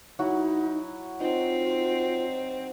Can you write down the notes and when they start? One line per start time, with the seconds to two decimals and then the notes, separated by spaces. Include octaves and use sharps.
0.19 F#3 D#4 E4 F#4
1.20 C4 D#4 F4